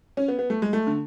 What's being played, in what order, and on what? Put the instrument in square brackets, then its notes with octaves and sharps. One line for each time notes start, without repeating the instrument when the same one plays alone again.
[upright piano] C#4
B3
B3
A3
G#3
A3
D3